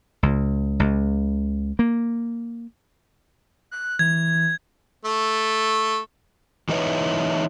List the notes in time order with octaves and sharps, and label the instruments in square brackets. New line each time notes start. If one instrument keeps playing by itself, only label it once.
[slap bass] C#2
C#2
A#3
[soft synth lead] F#6
[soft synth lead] E3 [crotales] G#6
[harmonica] A3
[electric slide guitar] E3 G3 D#4 E4 B4 C#5